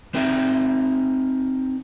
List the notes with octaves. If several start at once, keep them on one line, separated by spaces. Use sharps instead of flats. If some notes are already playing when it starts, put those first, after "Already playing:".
C4 D#4 A#4 E5 G5